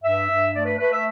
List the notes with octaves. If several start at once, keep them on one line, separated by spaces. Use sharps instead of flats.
G2 E5
G2
A3 D5
B4
A3 B4
E5